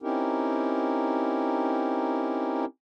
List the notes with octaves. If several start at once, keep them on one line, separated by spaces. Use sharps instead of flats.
C4 C#4 D#4 E4 G4 A#4